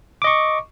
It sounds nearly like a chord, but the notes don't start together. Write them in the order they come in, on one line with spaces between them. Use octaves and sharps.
D6 D#5 C#6